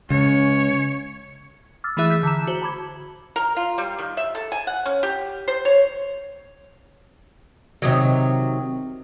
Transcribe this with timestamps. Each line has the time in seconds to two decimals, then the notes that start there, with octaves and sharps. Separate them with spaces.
0.10 C#2 C#3 C#4 C#5
1.84 D6 E6 F6 A6
1.97 E3 A3 E4 G#4 E5 F#6
2.09 E6 G6 B6
2.23 D3 A5 A#5 E7
2.47 F#4 C5
2.62 A5 B5 D6 G#6
3.36 A#4
3.57 F4
3.78 G3
3.99 D#3
4.17 E5
4.35 A4
4.52 G#5
4.67 F#5
4.86 C#4
5.03 G4
5.48 C5
5.65 C#5
7.82 C3 D#3 F#3